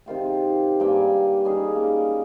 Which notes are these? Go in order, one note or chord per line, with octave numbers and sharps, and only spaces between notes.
C3 D#3 F4 G4
G4
G2 A#3 G5 G#5
G3 C#4 D#4 G#4
A#3